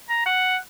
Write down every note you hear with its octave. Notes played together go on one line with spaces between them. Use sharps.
A#5
F#5